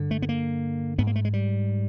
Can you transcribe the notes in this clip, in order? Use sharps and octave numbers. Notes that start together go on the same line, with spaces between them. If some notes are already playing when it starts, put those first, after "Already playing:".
Already playing: G2 D3
A3
B3
A#3
G#2 B3
A#3
A3
G#3
G3